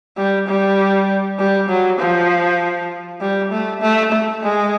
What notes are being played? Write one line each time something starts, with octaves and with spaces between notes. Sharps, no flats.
G3
G3
G3
F#3
F3
G3
A3
A3
A3
G#3